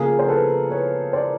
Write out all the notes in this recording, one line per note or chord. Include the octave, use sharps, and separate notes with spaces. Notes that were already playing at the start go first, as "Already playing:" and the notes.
Already playing: C#3 F3 A#3 G#4 A#4
C5
A4 B4
B4 C#5
C5 D5